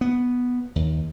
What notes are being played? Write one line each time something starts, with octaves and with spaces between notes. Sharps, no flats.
B3
D#2